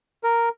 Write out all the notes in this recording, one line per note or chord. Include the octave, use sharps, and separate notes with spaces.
A#4